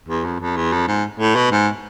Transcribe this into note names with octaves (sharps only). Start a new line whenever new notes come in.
E2
F2
F2
E2
F2
G#2
A2
B2
G#2